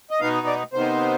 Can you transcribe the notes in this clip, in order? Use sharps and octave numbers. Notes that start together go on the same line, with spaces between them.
D#5
B2 B3 D#4 F5
D5
C3 D#3 B3 D#4 C5